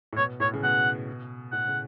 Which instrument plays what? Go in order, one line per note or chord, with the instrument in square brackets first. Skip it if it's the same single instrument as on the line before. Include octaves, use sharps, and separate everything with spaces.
[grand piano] A2
[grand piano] B2 [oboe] C#5
[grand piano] A2 [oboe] C#5
[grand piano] C#3
[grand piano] B2 [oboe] F#5
[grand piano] A2 [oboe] F#5
[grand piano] C#3